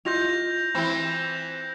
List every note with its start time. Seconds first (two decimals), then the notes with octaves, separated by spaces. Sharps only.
0.05 E4 F4 D#5 G6 A#6 F7
0.75 E3 C4 E4 B5